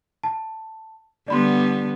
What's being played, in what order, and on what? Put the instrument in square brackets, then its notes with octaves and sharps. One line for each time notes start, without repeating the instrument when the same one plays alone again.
[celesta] A5
[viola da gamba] D3 G3 B3 [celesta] D5 B5 C6